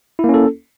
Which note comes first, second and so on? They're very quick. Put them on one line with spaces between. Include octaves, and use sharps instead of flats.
E4 A#3 C#4 A4